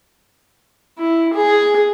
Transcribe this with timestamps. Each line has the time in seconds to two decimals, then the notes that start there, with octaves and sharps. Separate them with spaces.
0.99 E4
1.33 G#4